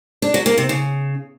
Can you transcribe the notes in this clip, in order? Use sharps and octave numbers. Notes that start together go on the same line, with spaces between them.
D4
F#3
A#3
C3
C#3